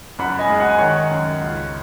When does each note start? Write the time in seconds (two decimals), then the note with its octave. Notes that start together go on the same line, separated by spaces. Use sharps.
0.19 F#2 F#5 B5
0.39 D#5 G#5
0.49 G#3
0.60 F#5
0.69 G#5
0.78 D#3 C#5 F#5
1.11 F#2
1.41 C#2